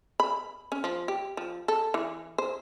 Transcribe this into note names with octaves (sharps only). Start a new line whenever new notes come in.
B5
C#4
F3
G4
F3
A4
E3
C5